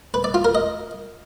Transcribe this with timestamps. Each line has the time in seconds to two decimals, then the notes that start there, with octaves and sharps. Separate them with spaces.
0.14 B4
0.24 D5
0.34 F4
0.45 A#4
0.55 D#5